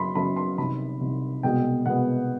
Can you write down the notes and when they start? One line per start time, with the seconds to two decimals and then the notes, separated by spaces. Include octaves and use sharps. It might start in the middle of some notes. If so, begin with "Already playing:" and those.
Already playing: F#1 F#2 C#3 B5 C6
0.15 F#1 F#2 C#3 B5
0.36 C6
0.58 C2 C3 D#3 B5
1.01 C2 C3 D#3
1.43 C2 B2 G#3 B3 G5
1.86 C2 B2 G#3 B3 F#5